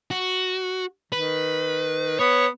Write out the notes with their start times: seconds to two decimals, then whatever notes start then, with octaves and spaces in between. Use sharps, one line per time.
0.11 F#4
1.12 D#3 B4
2.19 B3 C#5